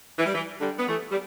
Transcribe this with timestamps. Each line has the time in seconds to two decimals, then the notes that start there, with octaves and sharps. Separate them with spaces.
0.18 E3
0.26 G3
0.34 E3
0.60 D3 G3
0.78 B3
0.87 E3 A3
1.11 G3